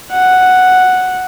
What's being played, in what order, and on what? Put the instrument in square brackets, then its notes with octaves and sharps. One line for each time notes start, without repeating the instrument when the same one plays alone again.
[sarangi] F#5